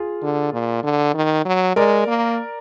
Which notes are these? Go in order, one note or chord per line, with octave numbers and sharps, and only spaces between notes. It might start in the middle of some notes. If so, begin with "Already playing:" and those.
Already playing: F4 G#4
D3
A#2
D3
D#3
F#3
G#3 A#4 D5
A#3